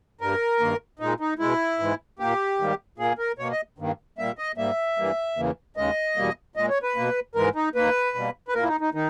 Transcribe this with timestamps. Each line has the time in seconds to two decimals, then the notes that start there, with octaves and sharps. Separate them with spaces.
0.21 G2 G3 A#3 A#4
0.60 G2 D#3 A#3
0.99 A#2 G#3 D#4
1.20 D#4
1.39 B2 G#3 E4
1.79 G#2 E3 G#3
2.19 A#2 A#3 G4
2.58 G#2 D#3 G3 A#3
2.98 A#2 A#3 G#4
3.18 A#4
3.38 B2 A#3 C#5
3.52 D#5
3.78 G2 D#3 A#3
4.18 A#2 G3 A#3 E5
4.38 D#5
4.57 G#2 G3 A#3 E5
4.97 G2 E3 G3 A#3
5.37 E2 C#3 E3 A#3
5.76 D#2 C#3 G#3 D#5
6.16 E2 B2 G3 A#3
6.56 A#2 G#3 D#5
6.69 C#5
6.83 B4
6.96 B2 A#3
7.35 G#2 E3 G#3 A#4
7.55 D#4
7.75 D#2 D#3 A#3 B4
8.15 B2 G3 A#3
8.48 B4
8.55 A#2 A#3 A#4
8.63 E4
8.68 D#4
8.81 D#4
8.94 D#3 D#4